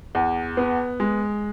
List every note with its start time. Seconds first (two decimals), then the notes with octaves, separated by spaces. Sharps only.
0.15 E2
0.57 B3
1.00 G#3